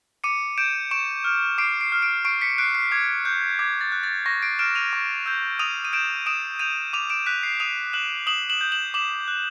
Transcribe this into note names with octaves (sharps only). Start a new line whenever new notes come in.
D6 C#7 D#7
G6 D7 E7
C#6 D7 E7
F6
D6 C7 D7
C7 D7
F6
C7 D7
C#6 C7 D7
B6 C#7
F#6 C7 D7
C7
D6 G#6
F#6 G6
D6 G#6
A6
F#6
A6
C#6 A#6
C7 D7
F6 D7 E7
D#7 F7
C#6
E6 G6
D#6 D#7 F7
D#7
G6 D7 E7
D#6 D7 E7
G6 D#7 F7
D6 D#7 F7
D7 E7
F#6 B6
C7
D#6 D#7 F7
F#6 E7 F#7
D#6 E7 F#7
E7 F#7
G6
E7 F#7
D6 E7 F#7
F#6